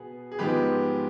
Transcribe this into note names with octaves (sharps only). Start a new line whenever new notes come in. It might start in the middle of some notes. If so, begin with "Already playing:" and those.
Already playing: B2 B3 G#4
G#4
G#2 F3 G#3 B3 G4 B4